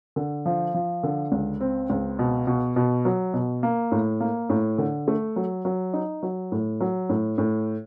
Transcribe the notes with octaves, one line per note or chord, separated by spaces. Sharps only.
D3
F3
F3
D3
C#2
C4
C#2
B2
B2
B2
F#3
B2
A#3
A2
A#3
A2
D3
A3
F#3
F#3
D#4
F#3
A2
F#3
A2
A2